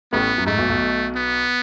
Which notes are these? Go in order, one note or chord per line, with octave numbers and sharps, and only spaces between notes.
A1 A2 B3
F#2
G#2 A3
B1 B2
B1 B2
B3